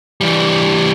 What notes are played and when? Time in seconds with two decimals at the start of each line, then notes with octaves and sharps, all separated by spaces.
0.21 E3 G3